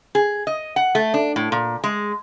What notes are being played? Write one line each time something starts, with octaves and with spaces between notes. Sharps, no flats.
G#4
D#5
F#5
A3
D4
A2
A#2
G#3